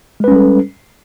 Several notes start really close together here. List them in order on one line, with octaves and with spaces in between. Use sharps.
G#3 B4 C#4 G3 A4